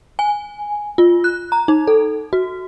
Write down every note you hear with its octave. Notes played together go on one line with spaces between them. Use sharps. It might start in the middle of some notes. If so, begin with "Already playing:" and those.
G#5
F4
F#6
A#5
D#4
A4
F#4